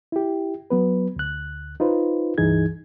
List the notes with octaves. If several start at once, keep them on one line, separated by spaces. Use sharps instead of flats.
E4 G4
F#3 B3 B4
D2 F#6
D#4 F4 B4 C5
C#2 G2 E3 D#4 G#4 G#6